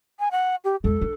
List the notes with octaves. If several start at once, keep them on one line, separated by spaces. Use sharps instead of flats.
G#5
F#5
G4
E2 G#3 A4
D4